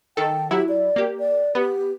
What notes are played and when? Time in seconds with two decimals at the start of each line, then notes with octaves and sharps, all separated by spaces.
0.17 D#3 A4 G5
0.51 F#3 E4 G4
0.69 D5
0.96 A#3 G4
1.19 D5
1.55 B3 G4